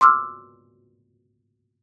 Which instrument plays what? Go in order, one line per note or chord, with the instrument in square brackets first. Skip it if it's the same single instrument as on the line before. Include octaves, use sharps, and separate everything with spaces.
[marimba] C6 D6 E6 F6